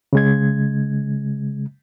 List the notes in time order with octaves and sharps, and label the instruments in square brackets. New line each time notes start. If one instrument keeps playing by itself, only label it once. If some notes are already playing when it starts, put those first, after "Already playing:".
[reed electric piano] C#3 G#3 G#6